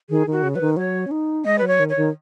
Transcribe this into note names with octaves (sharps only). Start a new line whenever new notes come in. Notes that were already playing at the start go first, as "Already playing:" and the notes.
D#3 G#4
D#3
F#4
C#3
F#3 B4
D#3
F#3 C#5
C#4
D#4
G#3 D#5
F#3 B4
C#5
D#3
C#5
D#3